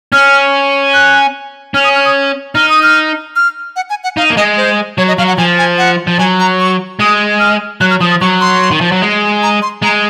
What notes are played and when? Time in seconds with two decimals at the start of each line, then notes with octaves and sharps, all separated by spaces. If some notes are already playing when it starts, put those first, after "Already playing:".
0.12 C#4 F6
0.94 F#6
1.74 C#4 F6
1.84 D#6
1.95 F6
2.05 D#6
2.55 D#4 F6
2.69 D#6
2.83 F6
3.36 F6
3.76 F#5
3.90 G#5
4.04 F#5
4.17 D#4 F5
4.30 A#3
4.37 G#3 D#5
4.57 C5
4.98 F#3 C#5
5.08 D#5
5.18 F#3 F5
5.28 F#5
5.38 F3 G#5
5.58 G#5
5.78 F#5
6.07 F3
6.19 F#3 G#5
6.40 A#5
6.60 C#6
6.99 G#3 D#6
7.40 F6
7.81 F#3 F#6
7.91 F6
8.01 F3 D#6
8.11 D#6
8.21 F#3 C#6
8.41 C6
8.71 D#3
8.81 F3
8.92 F#3
9.02 G#3
9.43 A#5
9.62 C6
9.82 G#3 A#5